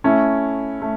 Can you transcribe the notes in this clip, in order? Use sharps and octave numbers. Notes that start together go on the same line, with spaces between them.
A3 C#4 E4
A3